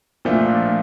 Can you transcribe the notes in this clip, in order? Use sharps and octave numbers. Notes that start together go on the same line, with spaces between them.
A#2 F3 A3 D4 F4